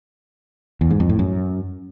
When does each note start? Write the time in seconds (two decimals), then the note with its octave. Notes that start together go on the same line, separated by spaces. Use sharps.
0.81 E2
0.90 G#2
1.00 F2
1.09 A2
1.19 F#2